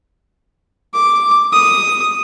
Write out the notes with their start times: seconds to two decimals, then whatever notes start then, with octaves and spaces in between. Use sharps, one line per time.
0.94 D6
1.52 D#6